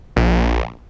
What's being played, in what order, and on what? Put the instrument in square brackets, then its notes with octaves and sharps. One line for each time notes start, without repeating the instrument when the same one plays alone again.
[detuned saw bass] A#1